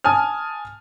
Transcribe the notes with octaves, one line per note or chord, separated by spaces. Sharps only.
G#5 A5 D#6 F6